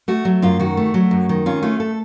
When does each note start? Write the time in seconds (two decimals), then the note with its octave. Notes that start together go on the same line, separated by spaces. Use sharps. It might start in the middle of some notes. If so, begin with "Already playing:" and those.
0.08 A3 F#4
0.25 F#3
0.42 F#2 F4
0.59 D#3 F#4
0.77 A3
0.94 F#3
1.11 F#2
1.29 D#3
1.46 C#4 F4
1.63 A3 F4
1.80 A4